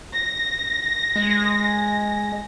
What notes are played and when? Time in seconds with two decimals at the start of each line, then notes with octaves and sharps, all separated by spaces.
0.14 A#6
1.16 G#3